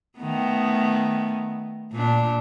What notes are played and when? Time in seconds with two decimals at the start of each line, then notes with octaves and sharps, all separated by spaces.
0.19 D#3 A3 B3
1.93 A#2 D4